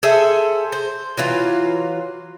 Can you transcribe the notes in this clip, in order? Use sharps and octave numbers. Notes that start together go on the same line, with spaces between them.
G#4 A4 C5 E5
C5
E3 F#3 F4